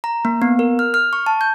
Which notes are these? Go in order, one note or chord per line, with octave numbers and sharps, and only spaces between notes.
A#5
A#3
B3
A#4
F6
F6
C#6
A5
G6